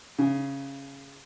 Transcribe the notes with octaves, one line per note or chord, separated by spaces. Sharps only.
C#3